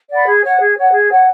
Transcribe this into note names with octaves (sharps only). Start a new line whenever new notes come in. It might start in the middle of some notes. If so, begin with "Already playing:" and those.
D5 F#5 B5
G#4
C#5 F#5
G#4
C#5 F#5
G#4
C#5 F#5